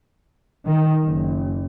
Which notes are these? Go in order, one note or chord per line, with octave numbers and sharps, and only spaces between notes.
D#3
F#1